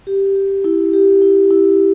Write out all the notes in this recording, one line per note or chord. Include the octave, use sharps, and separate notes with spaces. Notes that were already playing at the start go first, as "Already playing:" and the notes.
G4
G4
E4
G4
E4
E4